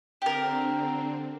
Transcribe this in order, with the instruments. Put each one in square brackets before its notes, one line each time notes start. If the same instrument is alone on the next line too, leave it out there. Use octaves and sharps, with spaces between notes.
[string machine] D3 C4 [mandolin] G4 A#4